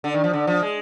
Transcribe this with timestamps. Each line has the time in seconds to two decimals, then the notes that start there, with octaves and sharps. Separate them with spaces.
0.04 D3
0.14 D#3
0.24 F3
0.33 D3
0.47 F3
0.62 G#3